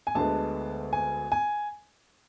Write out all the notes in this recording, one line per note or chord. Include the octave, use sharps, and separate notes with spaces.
G#5
D2 D3 G#3 B3 A5
G#5
G#5